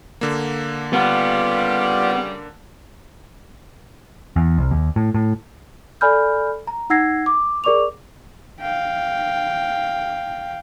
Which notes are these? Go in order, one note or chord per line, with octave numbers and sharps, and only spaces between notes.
D3 A#3
C#3 G3 B3 F4 F5
E2
C2
D#2
A2
A2
A4 D5 G#5 B5 F6 G6
A#5
D#4 F#5 E6 G#6 A#6 C7
D6
G#4 A#4 D5 C#6 D6 F7
F5 G5